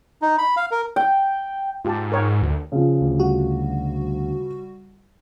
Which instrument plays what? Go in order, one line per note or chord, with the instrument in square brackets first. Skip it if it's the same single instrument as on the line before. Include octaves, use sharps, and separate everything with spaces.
[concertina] D#4
B5
F5
A#4
[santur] G5
[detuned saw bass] G#2 [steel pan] F4 G4 A5
[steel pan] A#4 C#5 G5
[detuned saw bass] D2
[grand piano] C#3 F3
[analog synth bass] D2
[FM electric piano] G3 F#4